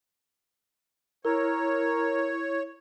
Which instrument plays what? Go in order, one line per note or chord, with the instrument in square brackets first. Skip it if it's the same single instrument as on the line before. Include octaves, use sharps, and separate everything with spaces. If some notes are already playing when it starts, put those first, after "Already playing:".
[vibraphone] E4 [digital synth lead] A#4 [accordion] C#5